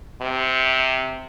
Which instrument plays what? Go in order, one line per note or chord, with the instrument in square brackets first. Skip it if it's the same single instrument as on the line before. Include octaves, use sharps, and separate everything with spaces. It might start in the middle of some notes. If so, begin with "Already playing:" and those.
[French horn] C3